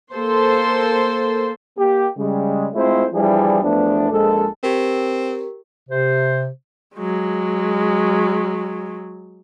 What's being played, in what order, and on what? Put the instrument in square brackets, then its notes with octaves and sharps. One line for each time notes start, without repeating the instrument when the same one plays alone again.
[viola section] A#3 A4 C5 C6
[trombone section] A#3 G4
C#3 G3 G#3
G#3 A3 C4 E4 F4 C5
E3 F3 G3 D4 E4 G#4
E2 F3 A3 B3 D4
A#1 G#3 A4
[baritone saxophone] C4 [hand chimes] G4 A#4
[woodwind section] C3 C5
[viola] F#3 G#3